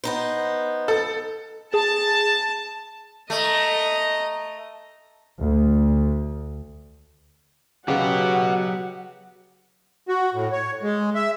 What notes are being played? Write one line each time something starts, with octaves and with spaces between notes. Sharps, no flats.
B3 D#4 C5
A4
G#4 A5
A3 D#5 A#5
D2
C#3 F#3 F#4 G4 B4 F5 F#5
F#4
A2
C#5
G#3
E5